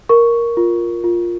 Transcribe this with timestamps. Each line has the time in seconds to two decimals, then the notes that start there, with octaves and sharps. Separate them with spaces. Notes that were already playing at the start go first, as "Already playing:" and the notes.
0.09 A#4 C#6
0.57 F4
1.04 F4